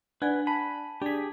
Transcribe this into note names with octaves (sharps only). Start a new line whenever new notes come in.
D4 B4 F#5 G#5 G#6
A5 B5
D4 G4 G#4 B6